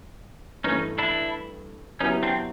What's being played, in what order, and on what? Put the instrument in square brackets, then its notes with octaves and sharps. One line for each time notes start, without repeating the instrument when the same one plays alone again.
[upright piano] G2 E3 A3 [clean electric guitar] C#4 D#4
[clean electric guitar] D4 E4
[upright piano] F#3 B3 E4 G4 [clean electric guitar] C#4 D#4
[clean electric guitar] C4 D4